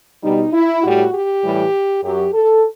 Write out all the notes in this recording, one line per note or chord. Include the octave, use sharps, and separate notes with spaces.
B2 G3 D#4
E4
A2 G3 F#4
G4
A2 E3 G3
F#2 F#3 G4
A4